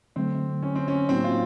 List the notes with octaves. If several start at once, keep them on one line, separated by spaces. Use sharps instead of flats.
D3 F#3 A3 C4
C#4
C4
C#4
A2 F#3 A#3 C4 D#4 F#4
F4